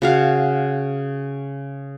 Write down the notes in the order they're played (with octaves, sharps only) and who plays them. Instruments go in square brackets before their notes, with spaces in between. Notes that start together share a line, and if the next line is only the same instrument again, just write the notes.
[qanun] C#3 F#4 F5